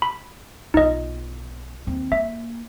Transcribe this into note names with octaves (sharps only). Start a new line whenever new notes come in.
B5
B1 D#4 F4 D#5
D#2 C4
A#3 E5